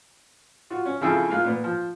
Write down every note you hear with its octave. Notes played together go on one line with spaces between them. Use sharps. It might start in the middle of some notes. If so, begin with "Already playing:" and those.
F4 F#4
C#4
C#3 F3 C4 E4 G#4 A4
A#3 F4 F5 F#6
A#2 B3
F3